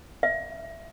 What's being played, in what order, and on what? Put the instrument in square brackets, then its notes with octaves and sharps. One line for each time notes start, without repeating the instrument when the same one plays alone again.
[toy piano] E5